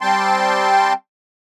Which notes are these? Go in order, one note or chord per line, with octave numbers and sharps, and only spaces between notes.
G3 C4 G5 A5 C6